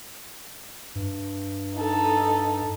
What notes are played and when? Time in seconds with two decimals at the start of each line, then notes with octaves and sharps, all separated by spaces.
0.95 G2
1.76 D#4 A4